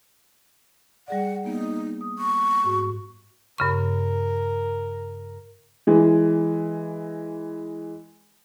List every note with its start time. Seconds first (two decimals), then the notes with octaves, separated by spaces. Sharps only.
1.08 G3 G#4 D5 F#5
1.44 A#3 B3 D#4
2.01 D#6
2.18 C#6
2.64 G#2 F#4
3.58 G2 C#3 A#4 C#6
5.87 E3 G#3